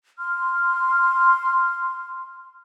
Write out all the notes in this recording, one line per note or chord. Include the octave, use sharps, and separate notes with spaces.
C6 F6